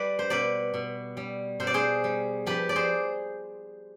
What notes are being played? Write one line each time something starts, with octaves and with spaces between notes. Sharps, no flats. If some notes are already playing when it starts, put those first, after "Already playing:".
Already playing: G3 B4 D5
C5
B2 B4 D5
B2
G3
B2 C5
D5
G#4 C5
G3
F3 G4 B4
D5
G#4 C5